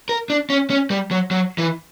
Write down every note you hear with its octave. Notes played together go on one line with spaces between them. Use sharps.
A#4
D4
C#4
C#4
G3
F#3
F#3
E3